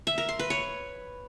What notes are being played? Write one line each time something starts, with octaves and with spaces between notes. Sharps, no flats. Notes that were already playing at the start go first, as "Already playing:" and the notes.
E5
A#4
C6
B4
C#5